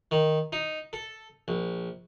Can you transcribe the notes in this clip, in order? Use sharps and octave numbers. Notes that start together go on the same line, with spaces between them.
D#3
D#4
A4
A#1